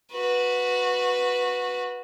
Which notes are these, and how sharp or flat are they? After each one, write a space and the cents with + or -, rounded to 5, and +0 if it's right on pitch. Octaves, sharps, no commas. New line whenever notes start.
F#4 -15 B4 +0